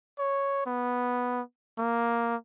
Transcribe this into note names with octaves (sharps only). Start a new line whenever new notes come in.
C#5
B3
A#3